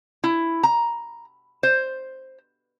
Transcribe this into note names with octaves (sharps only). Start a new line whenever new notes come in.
E4
A#5
C5